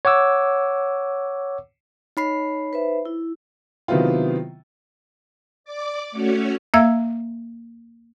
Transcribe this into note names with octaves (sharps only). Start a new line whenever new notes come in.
C#5 F#5 D6 E6
D#4 C#5 B5 C7
B4 C5 E5
E4
C3 D#3 F#3 B3 E4 F4
D5 D6
A3 C#4 F#4 C#5
A#3 E5 F5 E6 G#6